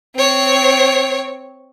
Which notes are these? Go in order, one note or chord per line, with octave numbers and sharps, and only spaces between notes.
C4 C#5